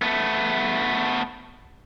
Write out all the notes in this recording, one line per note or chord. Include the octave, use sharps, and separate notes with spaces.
A3 B3